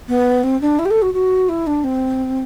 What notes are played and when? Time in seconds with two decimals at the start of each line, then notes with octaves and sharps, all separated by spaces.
0.09 B3
0.43 C4
0.61 D4
0.79 E4
0.85 G4
0.90 A4
1.02 F#4
1.14 F#4
1.49 E4
1.67 D4
1.84 C4